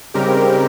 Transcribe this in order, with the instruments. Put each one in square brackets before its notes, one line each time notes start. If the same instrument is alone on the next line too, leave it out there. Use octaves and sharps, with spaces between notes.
[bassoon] G#2 [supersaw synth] C#3 G3 C4 G4 A#4